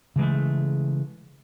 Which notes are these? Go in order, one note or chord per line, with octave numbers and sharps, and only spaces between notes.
C#3 E3 G#3 A3